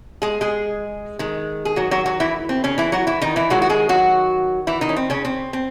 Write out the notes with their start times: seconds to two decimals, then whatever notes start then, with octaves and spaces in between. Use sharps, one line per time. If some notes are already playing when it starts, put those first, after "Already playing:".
0.22 G#3 G#4
0.41 G#3 G#4
1.19 D#3 G#3
1.65 G#4
1.76 F#3 F#4
1.91 F#3 F#4
2.06 F#3 F#4
2.20 E3 E4
2.49 C4
2.64 C#3 C#4
2.78 E3 E4
2.92 F#3 F#4
3.07 E3 E4
3.22 D#3 D#4
3.36 E3 E4
3.50 D#3 F#3 G#3 F#4
3.62 F#4
3.70 G#3 G#4
3.89 F#3 F#4
4.67 E3 E4
4.81 D#3 D#4
4.89 C#4
4.96 C4
5.10 C#3 C#4
5.25 C4
5.53 C4